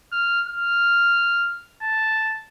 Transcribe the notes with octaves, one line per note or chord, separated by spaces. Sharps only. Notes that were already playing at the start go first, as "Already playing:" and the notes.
F6
F6
A5